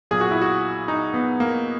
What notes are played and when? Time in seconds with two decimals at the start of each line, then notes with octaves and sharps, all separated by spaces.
0.11 B1 A#2 G#4
0.21 F#4
0.31 E4
0.41 F#4
0.88 D#4
1.14 B3
1.40 A#3